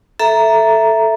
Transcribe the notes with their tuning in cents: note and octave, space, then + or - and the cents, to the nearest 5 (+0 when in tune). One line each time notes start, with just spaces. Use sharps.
A4 +0 E5 +5 A#5 +0